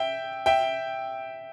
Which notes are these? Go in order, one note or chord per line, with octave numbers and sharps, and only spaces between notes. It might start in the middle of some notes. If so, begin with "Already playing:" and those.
Already playing: E5 G5
E5 G5